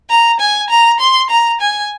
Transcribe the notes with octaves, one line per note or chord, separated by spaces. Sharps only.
A#5
G#5
A#5
C6
A#5
G#5